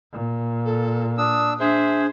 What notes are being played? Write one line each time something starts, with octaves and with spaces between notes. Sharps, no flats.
A#2
A4
D4 D#6 E6
D4 G#4 C5 E5